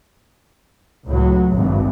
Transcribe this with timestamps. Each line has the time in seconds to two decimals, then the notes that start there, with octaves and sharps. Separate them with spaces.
1.07 C#2 A2 F#3
1.55 G#1 G2